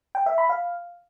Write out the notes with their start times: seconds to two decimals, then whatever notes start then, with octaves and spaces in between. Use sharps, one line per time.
0.15 G5
0.26 E5
0.38 B5
0.49 F5